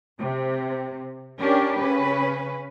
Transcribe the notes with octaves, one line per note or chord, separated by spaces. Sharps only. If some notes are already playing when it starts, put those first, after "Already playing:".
C3
C#4 D4 G4 A#4
C#3 C#4 B4